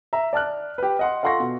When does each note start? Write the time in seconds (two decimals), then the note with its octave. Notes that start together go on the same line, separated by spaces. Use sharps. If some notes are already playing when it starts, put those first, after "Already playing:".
0.13 E5 A#5
0.33 D5 A5 F6 F#6
0.78 G4 B4
0.99 D#5 F#5 C6
1.23 F4 A4 F#5 C6 C#6 A#6
1.40 B2